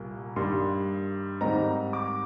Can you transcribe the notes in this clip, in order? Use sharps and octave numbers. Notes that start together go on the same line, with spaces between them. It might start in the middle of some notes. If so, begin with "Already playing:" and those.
Already playing: C2 A#2 G3 A#3
G2 D#3 G3 A#3 C6
G#2 D#3 G3 C4 D#4 A#5
D6